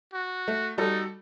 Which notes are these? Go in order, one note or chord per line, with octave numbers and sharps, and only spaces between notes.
F#4
A3
G3 D#4 F#4 A4